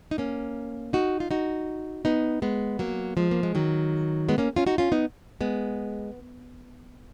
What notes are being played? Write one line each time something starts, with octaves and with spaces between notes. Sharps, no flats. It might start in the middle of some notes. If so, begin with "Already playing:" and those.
D#4
A#3 C#4
D#4 F#4
F4
D#4 F#4
B3 D#4
G#3 B3
F#3 A#3
F3 G#3
A#3
G#3
D#3 F#3
G#3 B3
A#3 C#4
C#4 F4
D#4 F#4
C#4 F4
B3 D#4
G#3 B3